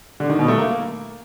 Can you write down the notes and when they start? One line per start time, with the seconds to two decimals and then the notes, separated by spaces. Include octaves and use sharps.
0.20 D3
0.29 D#3
0.39 B2
0.48 A3
0.58 A#3